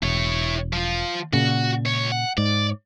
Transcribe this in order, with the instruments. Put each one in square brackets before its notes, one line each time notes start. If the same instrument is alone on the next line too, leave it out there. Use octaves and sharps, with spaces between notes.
[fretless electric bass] E1 [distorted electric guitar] E4 C#5
[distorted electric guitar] F3 F4
[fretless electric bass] A#2 C#3 [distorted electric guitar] F#4
[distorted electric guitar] C#2 C#5
F#5
[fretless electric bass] G#2 [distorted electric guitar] D5